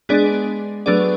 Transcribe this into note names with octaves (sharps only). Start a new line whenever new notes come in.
G#3 B3 D4 G#4 D5
F#3 A3 B3 D4 G#4 D5